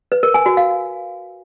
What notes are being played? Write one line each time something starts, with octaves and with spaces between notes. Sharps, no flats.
B4
A#4
G#5
F#4
F5